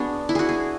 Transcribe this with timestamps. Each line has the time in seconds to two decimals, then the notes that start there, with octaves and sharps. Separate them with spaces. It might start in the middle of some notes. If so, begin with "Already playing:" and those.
Already playing: B3 D4 F#4 G#4
0.29 E4
0.35 F#4 G#4
0.49 G#4